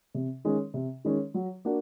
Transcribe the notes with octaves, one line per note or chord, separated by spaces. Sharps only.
C3
D#3 G#3 C#4
C3
D#3 G#3 C#4
F#3
A#3 D4 F#4